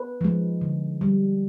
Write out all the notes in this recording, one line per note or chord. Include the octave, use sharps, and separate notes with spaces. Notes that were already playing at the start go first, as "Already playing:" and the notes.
Already playing: B4
F3 G#3
D3
G3